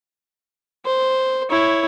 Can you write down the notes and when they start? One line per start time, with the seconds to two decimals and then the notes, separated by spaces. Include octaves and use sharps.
0.86 C5
1.50 E4 C#5